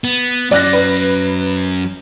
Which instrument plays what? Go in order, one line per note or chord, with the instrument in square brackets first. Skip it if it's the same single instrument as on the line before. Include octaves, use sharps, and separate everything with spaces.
[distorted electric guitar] B3
[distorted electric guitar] F#3 C#4 [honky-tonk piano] D5 F#6 A#6
[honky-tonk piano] B4